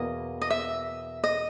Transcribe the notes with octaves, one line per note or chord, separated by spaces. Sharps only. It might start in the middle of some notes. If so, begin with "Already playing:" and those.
Already playing: E2 B2 A#3 D#5
D#5
E5
D#5